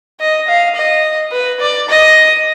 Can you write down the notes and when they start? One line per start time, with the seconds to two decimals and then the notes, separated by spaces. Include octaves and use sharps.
0.20 D#5
0.48 F5
0.76 D#5
1.32 B4
1.60 D5
1.89 D#5